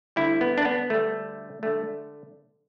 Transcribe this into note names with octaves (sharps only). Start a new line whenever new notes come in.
D2 D3 G3 E4
B3
D4
B3
D2 D3 G3 A3
D3 G3 A3